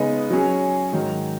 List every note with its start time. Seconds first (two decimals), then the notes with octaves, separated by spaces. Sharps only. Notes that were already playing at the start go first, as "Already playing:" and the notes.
Already playing: C#3 G#3 B3 D#4
0.31 F#3 C#4 G#4
0.93 G#2 D#3 F#3